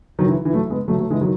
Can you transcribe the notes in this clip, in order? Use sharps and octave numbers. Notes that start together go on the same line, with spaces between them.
D#3 F#3
E3
E3
F#3 A3
G#3 B3
F#3 A3
F#3 A3
E3 G#3
D#3 F#3